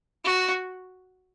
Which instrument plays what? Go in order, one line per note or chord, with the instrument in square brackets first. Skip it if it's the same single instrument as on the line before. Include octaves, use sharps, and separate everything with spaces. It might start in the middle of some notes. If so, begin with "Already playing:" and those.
[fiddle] F#4